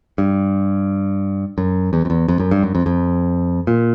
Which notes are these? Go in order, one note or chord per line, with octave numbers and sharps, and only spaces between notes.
G2
F#2
E2
F2
E2
F2
F#2
G2
F#2
F2
F2
A#2